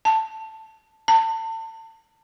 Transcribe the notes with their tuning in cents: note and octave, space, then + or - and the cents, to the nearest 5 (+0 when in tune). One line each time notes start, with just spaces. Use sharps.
A5 +5
A5 +35